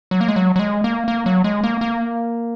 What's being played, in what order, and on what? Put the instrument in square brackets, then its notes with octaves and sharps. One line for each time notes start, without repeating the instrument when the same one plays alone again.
[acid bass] F#3
A#3
G#3
F#3
F#3
G#3
A#3
A#3
F#3
G#3
A#3
A#3